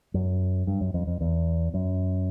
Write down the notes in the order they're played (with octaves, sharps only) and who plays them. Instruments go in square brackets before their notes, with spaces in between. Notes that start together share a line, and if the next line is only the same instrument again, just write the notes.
[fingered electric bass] F#2
G2
F#2
F2
F2
E2
F#2